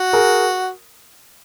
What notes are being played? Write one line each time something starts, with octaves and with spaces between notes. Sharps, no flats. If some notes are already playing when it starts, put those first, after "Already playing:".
Already playing: F#4
G#4 A#4